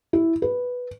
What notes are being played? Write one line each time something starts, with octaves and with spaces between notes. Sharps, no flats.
E4
B4